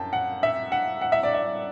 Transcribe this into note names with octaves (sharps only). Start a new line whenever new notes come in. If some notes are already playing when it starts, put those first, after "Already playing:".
Already playing: F#2 G5 A5
F#5
E5
F#5
F#5
E5
D5
E5